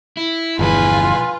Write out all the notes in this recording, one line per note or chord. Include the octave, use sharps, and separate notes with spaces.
E4
G1 E2 B2 F3 F4 B4 G#5